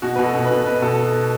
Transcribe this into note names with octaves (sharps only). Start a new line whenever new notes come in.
B2 F#4
B4
B2
A4
B2
B4
B2
B2 B4
B2 A4